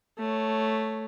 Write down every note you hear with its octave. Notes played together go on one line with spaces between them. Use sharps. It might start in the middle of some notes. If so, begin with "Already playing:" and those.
A3 C#5